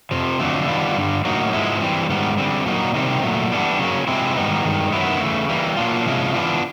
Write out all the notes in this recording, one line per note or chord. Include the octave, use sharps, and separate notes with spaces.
F2 C3 F3
F2 D3 F#3 A3
D#3 G3 B3 D4 F4
G2 D3 G3
A2 F#3 A#3 D#4 F#4
G#2 F3 G#3 B3 E4
E3 G3 C4
G#2 D#3 G3 B3
D3 G3 C4
A#2 F#3 A#3 D#4
C3 D#3 G3 C4 D#4
A#2 F#3 A3
E3 G3 B3 D4
C#3 F#3 A#3 C#4
C3 F3 G#3 C4 E4
G#2 D#3 G3 B3 D#4
G2 D#3 G#3
F#2 D#3 F#3 B3 E4
C#3 E3 A3
E3 G3 A#3
A#2 F#3 A#3 D4 F4
C3 F3 G#3 C#4 E4
E3 G#3 B3 D4 F4